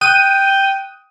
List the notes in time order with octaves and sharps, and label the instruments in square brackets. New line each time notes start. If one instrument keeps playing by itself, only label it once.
[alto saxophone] G5 [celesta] D#6 F#6 [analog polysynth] D#7